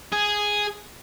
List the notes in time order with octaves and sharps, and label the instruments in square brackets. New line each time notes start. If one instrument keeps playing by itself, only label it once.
[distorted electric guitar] G#4